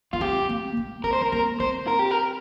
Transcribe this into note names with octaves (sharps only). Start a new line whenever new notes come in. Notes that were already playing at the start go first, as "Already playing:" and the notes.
A#3 F4
C4 G4
A#3
A#3
C4 A#4
C5
C4 A#4
A#3 A#4
C4 C5
A#4
G4
A#4